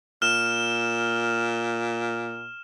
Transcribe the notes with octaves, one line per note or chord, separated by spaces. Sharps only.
A#2 F6 E7